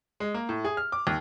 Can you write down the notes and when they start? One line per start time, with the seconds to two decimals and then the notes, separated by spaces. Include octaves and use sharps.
0.20 G#3
0.34 A#3
0.49 A2
0.65 G#4
0.77 F6
0.92 D6
1.07 D#2